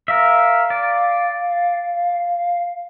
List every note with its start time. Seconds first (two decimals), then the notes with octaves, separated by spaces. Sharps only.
0.08 A#4 E5 F5
0.70 D5